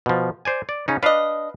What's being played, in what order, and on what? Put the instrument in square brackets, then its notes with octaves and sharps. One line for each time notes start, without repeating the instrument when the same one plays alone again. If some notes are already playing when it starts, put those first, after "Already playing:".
[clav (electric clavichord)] B2 F3
C5 D5 G#5
D5
C#3 C#4 D#4
[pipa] D4 D#5 [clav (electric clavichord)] B4 F5